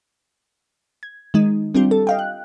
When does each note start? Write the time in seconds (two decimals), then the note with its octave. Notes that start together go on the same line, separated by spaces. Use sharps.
1.03 G#6
1.34 D#3 G#3 D#4
1.75 G3 C4 D4 F4 G4
1.91 A4
2.07 D#5 F5 G5
2.19 F#6